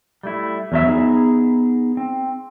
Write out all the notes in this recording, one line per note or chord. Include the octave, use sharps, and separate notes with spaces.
G3 A3 E4
E2 F#3 E5
B3 D#4 G#4
C4